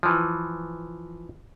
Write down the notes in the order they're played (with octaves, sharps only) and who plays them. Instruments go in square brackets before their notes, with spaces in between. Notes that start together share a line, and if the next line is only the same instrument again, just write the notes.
[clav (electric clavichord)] E3 F3